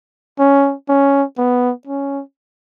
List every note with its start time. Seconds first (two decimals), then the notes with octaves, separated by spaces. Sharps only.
0.39 C#4
0.89 C#4
1.38 B3
1.87 C#4